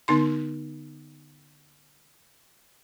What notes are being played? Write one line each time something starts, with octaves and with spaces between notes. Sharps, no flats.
D3 B3 D#4 C6